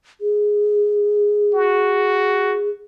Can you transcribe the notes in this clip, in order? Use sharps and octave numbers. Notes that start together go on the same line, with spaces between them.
G#4
F#4